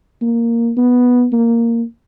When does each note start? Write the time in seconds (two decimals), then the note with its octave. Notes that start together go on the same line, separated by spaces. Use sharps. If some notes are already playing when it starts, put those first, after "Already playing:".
0.22 A#3
0.77 B3
1.33 A#3